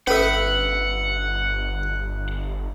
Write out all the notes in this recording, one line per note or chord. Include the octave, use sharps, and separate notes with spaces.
G1 C#4 A4 B4 E5 F#5